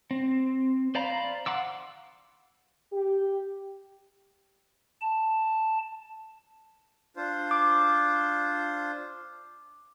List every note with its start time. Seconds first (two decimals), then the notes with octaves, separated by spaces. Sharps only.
0.11 C4
0.95 C5 D5 F5 A#5 B5
1.46 F5 F#5 C6 D6 E6
2.93 G4
5.01 A5
7.16 D4 F4 C5
7.51 D6